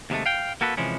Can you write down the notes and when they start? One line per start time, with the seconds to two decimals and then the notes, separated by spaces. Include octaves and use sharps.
0.10 D#2 C3 G#3 A3
0.26 F5 G5
0.61 A#3 F#4 A4 B4
0.77 C3 E3 F3 G#3 C#4